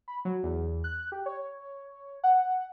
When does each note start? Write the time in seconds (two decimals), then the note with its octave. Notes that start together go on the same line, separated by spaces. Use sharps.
0.08 B5
0.25 F#3
0.43 E2
0.84 F#6
1.12 G4
1.26 C#5
2.24 F#5